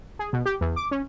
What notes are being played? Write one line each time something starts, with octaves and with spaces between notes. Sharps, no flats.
G#4
B2
G4
E2
D6
C#4